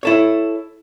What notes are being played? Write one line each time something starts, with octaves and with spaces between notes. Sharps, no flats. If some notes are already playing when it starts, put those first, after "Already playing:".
E4 A4 C#5